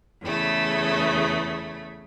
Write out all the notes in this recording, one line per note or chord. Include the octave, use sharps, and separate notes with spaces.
E2 C#3 A3